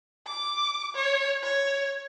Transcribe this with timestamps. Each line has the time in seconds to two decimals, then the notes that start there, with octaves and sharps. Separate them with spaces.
0.27 D6
0.95 C#5
1.43 C#5